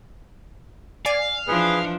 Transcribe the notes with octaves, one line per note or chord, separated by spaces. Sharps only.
D5 F5 G#5
E3 F3 D4 G#4 B4